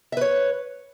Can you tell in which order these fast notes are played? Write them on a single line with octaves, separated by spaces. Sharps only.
E5 B4 C#5